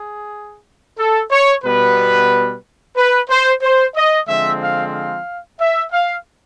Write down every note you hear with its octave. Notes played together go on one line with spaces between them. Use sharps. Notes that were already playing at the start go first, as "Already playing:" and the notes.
Already playing: G#4
A4
C#5
B2 G3 B3 B4
B4
C5
C5
D#5
D3 F3 G#3 C4 E5
F5
F5
E5
F5